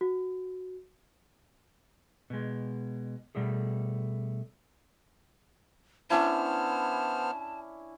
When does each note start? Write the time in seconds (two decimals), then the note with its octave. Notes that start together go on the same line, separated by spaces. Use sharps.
0.01 F#4
2.30 B2 G#3
3.35 B2 G3 A3 G#4
6.10 B3 C#4 D4 E4 C5 A5 F6